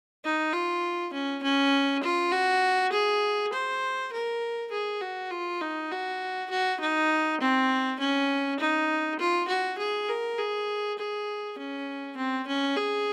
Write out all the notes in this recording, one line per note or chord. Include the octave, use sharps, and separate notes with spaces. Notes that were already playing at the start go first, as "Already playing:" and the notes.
D#4
F4
C#4
C#4
F4
F#4
G#4
C5
A#4
G#4
F#4
F4
D#4
F#4
F#4
D#4
C4
C#4
D#4
F4
F#4
G#4
A#4
G#4
G#4
C#4
C4
C#4
G#4